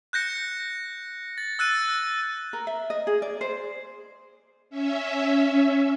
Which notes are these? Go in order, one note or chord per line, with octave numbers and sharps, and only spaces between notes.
F#6 G6 A#6 C#7
A6
E6 F#6 A6 D#7
A#4
E5
D#5
G#4
D5
C5
C#4 E5